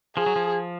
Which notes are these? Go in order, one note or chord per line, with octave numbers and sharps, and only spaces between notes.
F3 G#4
F#3
F3